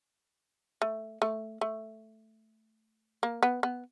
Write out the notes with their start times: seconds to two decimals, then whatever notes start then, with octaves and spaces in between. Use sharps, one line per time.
0.82 A3
1.22 A3
1.61 A3
3.23 A#3
3.43 B3
3.63 B3